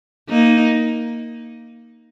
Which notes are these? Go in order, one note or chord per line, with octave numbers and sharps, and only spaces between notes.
A#3 D#4